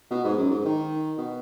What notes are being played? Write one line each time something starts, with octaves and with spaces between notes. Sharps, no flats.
B2
G#2
F#2
G#2
D#3
B2